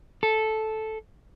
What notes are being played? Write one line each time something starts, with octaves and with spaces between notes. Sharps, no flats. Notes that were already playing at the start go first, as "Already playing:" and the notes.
A4